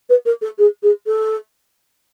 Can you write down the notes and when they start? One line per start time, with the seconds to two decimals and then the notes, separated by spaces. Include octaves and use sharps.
0.09 B4
0.25 A#4
0.41 A4
0.58 G#4
0.83 G#4
1.07 A4